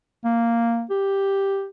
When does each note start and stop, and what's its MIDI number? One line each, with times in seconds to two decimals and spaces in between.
0.24 0.84 58
0.91 1.67 67